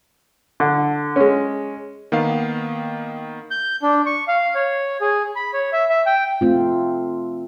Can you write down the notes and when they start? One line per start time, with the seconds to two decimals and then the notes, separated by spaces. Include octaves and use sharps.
0.60 D3
1.16 G#3 C#4
2.12 D#3 A#3 B3 F5 C7
3.51 G6
3.83 D4
4.06 C#6
4.28 F5
4.55 C#5
5.01 G#4
5.36 B5
5.54 C#5
5.73 E5
5.90 E5
6.06 G5
6.41 A3 C4 F4